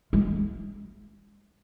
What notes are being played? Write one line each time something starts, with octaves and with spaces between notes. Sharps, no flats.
G#3